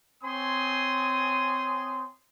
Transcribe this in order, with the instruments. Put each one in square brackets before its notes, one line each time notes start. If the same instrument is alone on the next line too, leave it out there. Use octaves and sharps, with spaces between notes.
[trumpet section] C4 C#5 G#5 C6 D#6